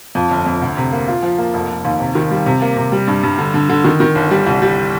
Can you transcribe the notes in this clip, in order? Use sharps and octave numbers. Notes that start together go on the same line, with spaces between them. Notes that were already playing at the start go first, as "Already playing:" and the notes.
F2
G1
F2
D2
C3
A#3
F4
F3
A#3
F1
F1
D#2
C3
D#3
G3
C3
A#3
C3
G3
G2
G2
D3
D3
D3
D#3
D#3
G1
G3
C2
G3